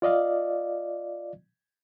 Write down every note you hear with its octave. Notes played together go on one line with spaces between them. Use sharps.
F4 D5 D#5 F5